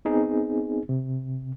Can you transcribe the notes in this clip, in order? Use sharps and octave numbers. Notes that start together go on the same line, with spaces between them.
B3 C4 D#4 G#4
C3